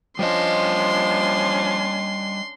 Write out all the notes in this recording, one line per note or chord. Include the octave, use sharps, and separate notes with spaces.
F3 G3 C#4 D4 D#5 C6